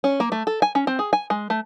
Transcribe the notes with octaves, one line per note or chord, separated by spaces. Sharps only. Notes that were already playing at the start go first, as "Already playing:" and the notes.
C#4
A#3
A3
A4
G#5
C#4
C4
G#4
G#5
G#3
A3